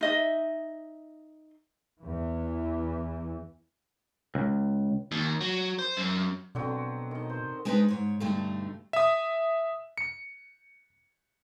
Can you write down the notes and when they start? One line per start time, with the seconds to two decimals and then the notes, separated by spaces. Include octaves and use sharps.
0.01 D#4 D#5 E5
2.01 E2 E3
4.35 C#2
5.11 D#2
5.41 F#3
5.78 C5
5.97 F#2
6.55 B2 D3 F#3 C4
7.11 D#3 D#5
7.29 C5
7.65 G#3 D4 D#4 F#4 B4 C5
7.88 G#2 C#5
8.20 G2 B2 D3 A3 D#4
8.93 E5 D#6
9.98 C#7